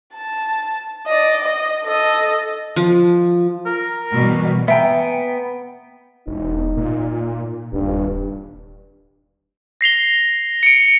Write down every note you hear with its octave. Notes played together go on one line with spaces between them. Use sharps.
A5
D5 D#5
D#5
A4 D#5
F3
A#4
B2 E3 G3
B3 E5 G5 G#5 A#5
E1 D#4
A#2
D#1 G2
A#6 C7 F7 G7
C#7 D7